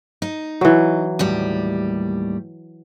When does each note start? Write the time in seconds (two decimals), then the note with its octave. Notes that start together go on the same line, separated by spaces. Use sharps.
0.22 D#4
0.61 E3 F#3
1.19 D#2 A2 G3